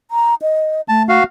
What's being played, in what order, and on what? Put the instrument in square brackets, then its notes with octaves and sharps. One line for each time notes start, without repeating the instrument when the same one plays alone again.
[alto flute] A#5
D#5
[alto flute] A3 [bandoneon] A5
[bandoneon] F#4 F5